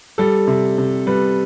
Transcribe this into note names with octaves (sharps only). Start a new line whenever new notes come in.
G3 A4
C3
C3
G3 B4